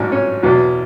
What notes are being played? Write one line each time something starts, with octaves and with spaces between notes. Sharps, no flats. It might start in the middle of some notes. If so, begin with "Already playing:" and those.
Already playing: A1 G#2 F#3 D4
C#4
E2 B2 F#3